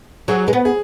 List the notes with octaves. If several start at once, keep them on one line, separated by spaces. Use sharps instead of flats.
F#3 G#4
G#3 B4
B3
G#4